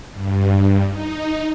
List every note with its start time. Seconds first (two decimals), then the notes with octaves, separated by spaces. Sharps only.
0.13 G2
0.88 D#4